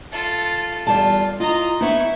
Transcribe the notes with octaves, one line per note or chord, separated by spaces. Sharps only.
F4 A4
E2 G3 F4 A5
F4 D#5 A#5
B3 D#4 E4 C#6